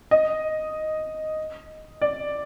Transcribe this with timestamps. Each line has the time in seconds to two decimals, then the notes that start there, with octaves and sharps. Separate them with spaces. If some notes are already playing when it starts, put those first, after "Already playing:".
0.11 D#5
2.02 D5